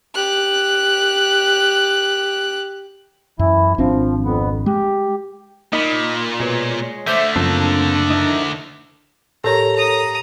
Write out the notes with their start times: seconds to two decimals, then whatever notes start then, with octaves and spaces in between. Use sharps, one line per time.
0.15 G4 F#6
3.39 F#2 E3 E4
3.78 G#1 F3 C4 D4
4.24 F2 B3
4.66 G#3 G4
5.73 A#2 D#4 D#5 B5
6.40 B2 G#3 B3 C#5
7.07 D3 A3 C5 E5 D6 G6
7.36 F#2 C#3 F3 A#3 C4 D4
8.10 D#4 E4 A#4
9.44 A2 G4 A4 A#4 C#5 A#5
9.75 A#5 D#6